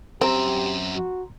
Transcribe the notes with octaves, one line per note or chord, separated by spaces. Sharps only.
F#2 C4 G4 E5 A#5 C6
F#4